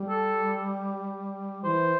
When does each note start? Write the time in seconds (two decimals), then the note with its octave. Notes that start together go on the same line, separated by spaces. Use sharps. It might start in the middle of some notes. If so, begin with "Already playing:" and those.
Already playing: G3
0.09 A4
1.64 E3 C5